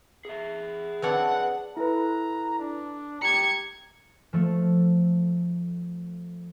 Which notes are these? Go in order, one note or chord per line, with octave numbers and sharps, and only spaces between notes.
G#4 E5
C4 D4 B4 C#5 F#5
E4 A4 B4 A#5
D4
G4 A#5 G#6 C#7
F3 A3